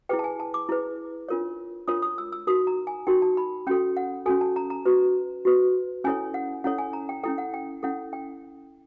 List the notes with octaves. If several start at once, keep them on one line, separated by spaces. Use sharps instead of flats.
E4 G#4 B4 G5
A5
G#5
A5
D6
E4 G#4 B4
D4 F4 A#4 C#5
D4 F4 A#4 C#5 D#6
D#6
E6
E6
D#4 F#4 A#4 D#6
A#5
G#5
D#4 F#4 A#4 G5
A5
B5
C#4 F#4 A4 G5
F#5
C#4 F#4 A4 G#5
A5
A#5
A#5
F#4 B4
F#4 B4
C#4 E4 A4 C#5 G#5
F#5
C#4 E4 A4 C#5 F#5
G#5
A#5
G5
C#4 E4 A4 G5
F#5
G5
C#4 E4 A4 F#5
G5